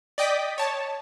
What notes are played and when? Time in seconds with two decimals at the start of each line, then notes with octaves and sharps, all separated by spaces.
0.18 D5 D#5 G5 D6 D#6 B6
0.58 C#5 A5